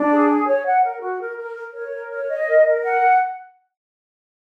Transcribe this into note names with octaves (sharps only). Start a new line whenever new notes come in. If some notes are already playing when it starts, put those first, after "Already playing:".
Already playing: D4
G#4
G#4
C#5
F#5
A#4
F#4
A#4
A#4
A#4
C#5
A#4
C#5
D#5
A#4
A#4
F#5